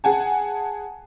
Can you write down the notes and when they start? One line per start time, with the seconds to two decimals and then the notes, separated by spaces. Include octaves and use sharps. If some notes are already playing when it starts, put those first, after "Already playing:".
0.04 G#4 F#5 G#5 A5